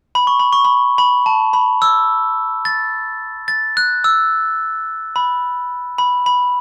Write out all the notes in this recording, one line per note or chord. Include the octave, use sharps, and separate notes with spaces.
B5
C#6
B5
C#6
B5
B5
A5
B5
E6
A6
A6
F#6
E6
B5
B5
B5